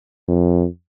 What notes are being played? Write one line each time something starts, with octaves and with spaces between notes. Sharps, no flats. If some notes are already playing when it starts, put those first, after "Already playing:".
F2